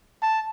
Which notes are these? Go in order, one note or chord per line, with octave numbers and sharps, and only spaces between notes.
A5